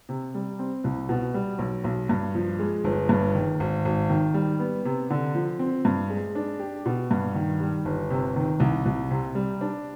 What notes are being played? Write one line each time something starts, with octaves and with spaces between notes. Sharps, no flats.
C3
G3
C4
C2
B2
G3
B1
B1
G2
F3
G#3
G1
G2
D#3
G#1
G#1
D#3
G3
B3
C3
D3
F3
C4
G2
G#3
D4
G4
B2
G2
D#3
G3
G1
C3
D#3
C2
C2
C3
G3
D4